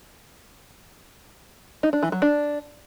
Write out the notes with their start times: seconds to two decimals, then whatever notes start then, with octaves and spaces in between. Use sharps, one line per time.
1.83 D#4
1.93 D4
2.03 E3
2.12 F#3
2.22 D4